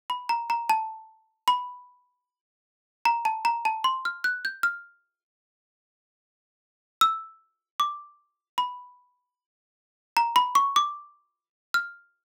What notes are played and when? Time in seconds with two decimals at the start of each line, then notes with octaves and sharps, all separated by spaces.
0.10 B5
0.29 A#5
0.50 A#5
0.69 A5
1.48 B5
3.05 A#5
3.25 A5
3.45 A#5
3.65 A5
3.84 C6
4.05 F6
4.24 F#6
4.45 G6
4.63 F6
7.01 E6
7.80 D6
8.58 B5
10.17 A#5
10.36 B5
10.55 C#6
10.76 D6
11.74 F6